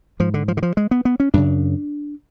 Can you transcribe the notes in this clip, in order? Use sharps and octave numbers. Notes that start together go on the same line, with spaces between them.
G#2 F3
D3
F3
D3
F3
G#3
B3
B3
C#4
F#2 C#3 D4